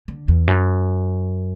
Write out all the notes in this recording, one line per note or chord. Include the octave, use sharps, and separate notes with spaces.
D3
E2
F#2